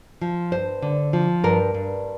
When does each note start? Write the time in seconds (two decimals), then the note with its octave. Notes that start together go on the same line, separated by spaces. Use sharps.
0.22 F3
0.52 G2 C5
0.82 D3
1.13 F3
1.44 G2 A#4
1.74 G2